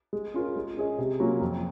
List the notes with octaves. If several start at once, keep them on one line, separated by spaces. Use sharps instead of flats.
G#3
C#4 F4 A#4
G#3
C#4 G#4 D#5
C3
F#3 A#3 C#4 F4
F2